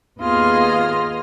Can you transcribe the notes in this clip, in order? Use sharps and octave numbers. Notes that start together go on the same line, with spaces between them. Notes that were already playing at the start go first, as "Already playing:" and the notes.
D#2 B3 F4 G#4 D#5 F6